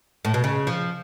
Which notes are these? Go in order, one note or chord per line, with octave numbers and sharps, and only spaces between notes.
A2
B2
C#3
F3